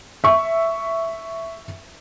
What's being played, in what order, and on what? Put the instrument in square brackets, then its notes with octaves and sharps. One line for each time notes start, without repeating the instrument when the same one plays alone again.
[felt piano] E5 C#6